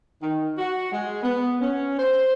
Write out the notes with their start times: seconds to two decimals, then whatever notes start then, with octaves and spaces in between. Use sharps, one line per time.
0.22 D#3
0.58 F#4
0.92 G#3
1.23 B3
1.61 C#4
1.99 C5